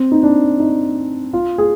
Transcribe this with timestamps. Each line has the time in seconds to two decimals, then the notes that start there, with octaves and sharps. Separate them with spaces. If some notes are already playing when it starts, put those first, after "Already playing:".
Already playing: C4
0.12 D#4
0.23 D4
0.60 D#4
1.33 F4
1.58 G#4